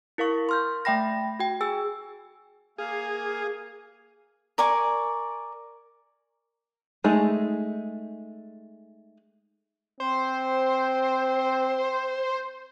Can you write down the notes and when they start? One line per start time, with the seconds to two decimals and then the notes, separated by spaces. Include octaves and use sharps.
0.18 E4 A#4 F5 C#6
0.49 C6 F6 G6
0.85 A3 E5 G5 B5 A#6
1.40 F#4 G5
1.61 G#4 G#5 E6
2.78 A#3 G#4 F5
4.58 A#4 D5 G#5 C#6
7.04 G#3 A3 D#4 G#4
10.00 C4 C5